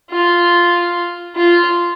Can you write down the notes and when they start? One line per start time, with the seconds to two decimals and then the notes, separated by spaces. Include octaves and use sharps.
0.10 F4
1.36 F4